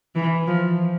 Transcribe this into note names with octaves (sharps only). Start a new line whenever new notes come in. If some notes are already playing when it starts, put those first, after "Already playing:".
E3
F3